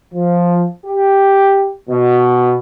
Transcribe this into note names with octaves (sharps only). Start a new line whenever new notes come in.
F3
G4
B2